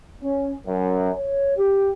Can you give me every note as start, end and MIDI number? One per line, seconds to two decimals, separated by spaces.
0.23 0.52 61
0.66 1.09 42
1.15 1.54 73
1.57 1.91 67